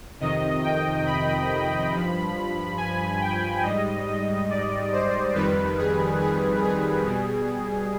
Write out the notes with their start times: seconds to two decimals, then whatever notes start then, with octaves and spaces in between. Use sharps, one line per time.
0.20 F2 C3 D#3 D#5
0.63 G5
1.06 B5
1.92 G2 F3
2.77 G#5
3.21 G5
3.63 G#2 G3 D#5
4.06 D#5
4.50 D5
4.93 C5
5.34 F2 D#3 G3 B4
5.78 G#4
6.21 G#4
6.63 G#4
7.06 B2 G3